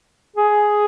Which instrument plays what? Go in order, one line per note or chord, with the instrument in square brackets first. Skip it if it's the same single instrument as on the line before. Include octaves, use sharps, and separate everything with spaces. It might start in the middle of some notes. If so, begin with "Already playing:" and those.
[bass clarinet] G#4